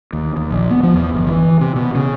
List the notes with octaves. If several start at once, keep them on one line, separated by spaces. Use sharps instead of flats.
D#2
D#2
A#1
B3
F3
E2
G1
E3
C3
B2
C#3